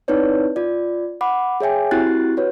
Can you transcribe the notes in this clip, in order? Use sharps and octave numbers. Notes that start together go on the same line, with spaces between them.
C4 D#4 E4 B4 C#5 D5
F4 D5
F#5 B5 D6
G#4 C#5 E5 G5 G#5
C4 E4 F#4 G4 F#6 A6
F#4 B4 C#5